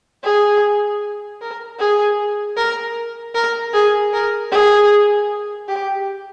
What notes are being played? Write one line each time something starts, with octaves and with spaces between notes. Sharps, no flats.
G#4
A#4
G#4
A#4
A#4
G#4
A#4
G#4
G4